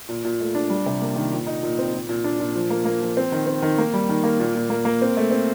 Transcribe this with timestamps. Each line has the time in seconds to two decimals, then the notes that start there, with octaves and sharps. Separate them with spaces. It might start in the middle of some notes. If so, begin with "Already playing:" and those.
0.09 A#2
0.24 A#2
0.40 A3
0.55 D4
0.70 G3
0.86 C3
1.02 A#3
1.16 D#3
1.32 A#2
1.47 D#4
1.63 A#2
1.79 C4
1.93 A#2
2.09 A#2
2.24 D4
2.40 A#2
2.55 F3
2.70 A#3
2.85 A#3
3.02 F3
3.17 C4
3.32 D#3
3.47 C4
3.62 D#3
3.78 A#3
3.94 G3
4.09 D#3
4.24 A#3
4.40 A#2
4.55 A#2
4.70 A#3
4.85 A#3
5.02 C4
5.17 A3
5.31 C4